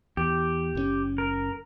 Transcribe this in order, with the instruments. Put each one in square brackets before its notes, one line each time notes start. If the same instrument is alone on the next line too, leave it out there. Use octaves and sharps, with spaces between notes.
[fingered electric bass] E2 [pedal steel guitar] G4
[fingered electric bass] F#1 C3 C#4
[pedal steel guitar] A#4